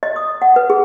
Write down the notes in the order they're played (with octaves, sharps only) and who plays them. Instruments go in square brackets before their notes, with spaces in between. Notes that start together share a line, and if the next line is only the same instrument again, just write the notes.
[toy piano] D#5
D#6
F#5
B4
G#4